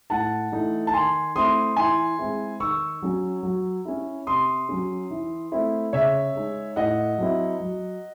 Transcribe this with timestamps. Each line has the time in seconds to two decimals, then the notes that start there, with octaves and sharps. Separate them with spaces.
0.10 A2 F#5 A5
0.52 E3 A3 D#4
0.87 A5
0.94 D#3 G#5 C6
1.36 A3 C4 E4 C6 D#6
1.77 E3 G#5 C6
2.19 G#3 C4 E4
2.60 D#3 C#6 E6
3.02 F#3 C#4
3.43 F#3
3.85 C#4 E4
4.27 C3 C6 D#6
4.69 F#3 C#4
5.11 E3
5.52 A3 C4 E4
5.93 C#3 C#5 E5
6.35 G#3 D#4
6.76 A2 D#5 F#5
7.18 F#3 C4 E4
7.60 F#3